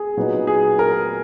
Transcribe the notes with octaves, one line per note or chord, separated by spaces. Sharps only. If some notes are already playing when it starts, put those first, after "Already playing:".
Already playing: G#4
A#2 F#3 B3 D#4
G#4
A#4